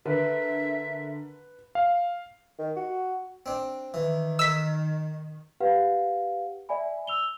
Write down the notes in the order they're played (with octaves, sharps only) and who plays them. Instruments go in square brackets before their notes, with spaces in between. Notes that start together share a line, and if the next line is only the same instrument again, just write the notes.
[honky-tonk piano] D3 A#4 [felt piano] B4 [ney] E5
[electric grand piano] F5
[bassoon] D#3
F#4
[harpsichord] C4 D4
[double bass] D#3 [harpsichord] E3
[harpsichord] D#4 A#4 [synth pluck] E6 B6
[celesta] G4 B4 F5 F#5
D5 E5 G#5 B5
E6 F7 G7